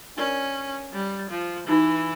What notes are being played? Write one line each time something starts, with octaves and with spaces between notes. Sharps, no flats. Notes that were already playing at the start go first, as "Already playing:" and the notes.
C#4 D4 F4 A#4 D5
G3
F3
E3 D#4 F#4 B4